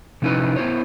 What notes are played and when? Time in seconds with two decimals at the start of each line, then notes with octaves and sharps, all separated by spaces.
0.22 C3 F3 C#4 D#4 E4 B4
0.56 B3 E4 C5 C#5